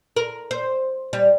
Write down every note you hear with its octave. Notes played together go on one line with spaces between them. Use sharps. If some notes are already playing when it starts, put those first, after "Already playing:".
A#4
C5
G3